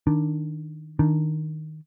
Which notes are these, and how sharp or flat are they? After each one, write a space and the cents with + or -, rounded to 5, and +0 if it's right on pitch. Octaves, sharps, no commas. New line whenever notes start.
D#3 +0 D4 +0
D#3 +0 D4 +0